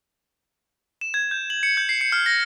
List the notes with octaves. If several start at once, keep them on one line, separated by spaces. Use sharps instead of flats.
E7
G#6
G6
F#7
C#7
G6
C7
C#7
F6
A#6